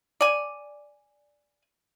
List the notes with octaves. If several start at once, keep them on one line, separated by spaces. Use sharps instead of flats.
D5 G#5